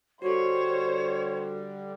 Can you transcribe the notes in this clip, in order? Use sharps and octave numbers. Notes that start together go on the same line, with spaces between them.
D3 G3 F#4 A4 C5 C#5